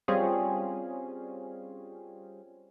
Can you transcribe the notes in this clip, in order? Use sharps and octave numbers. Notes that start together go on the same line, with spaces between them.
G3 C4 C#4 F4 G#4